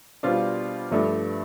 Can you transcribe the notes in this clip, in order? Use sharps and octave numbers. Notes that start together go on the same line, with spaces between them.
B2 G3 D4 F4 C5
G2 F3 A3 D4